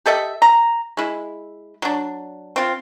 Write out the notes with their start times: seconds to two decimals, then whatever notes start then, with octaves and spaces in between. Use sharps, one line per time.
0.06 G4 A4 D#5 E5
0.42 A#5
0.97 G#3 E4
1.82 F#3 D4
2.56 C4 F4